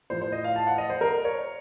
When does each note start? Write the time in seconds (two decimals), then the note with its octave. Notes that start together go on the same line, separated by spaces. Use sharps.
0.10 A2 F3 C5
0.22 C5
0.32 D#5
0.44 F5
0.56 A5
0.67 F#5
0.78 D#5
0.90 C5
1.01 A#4
1.25 C#5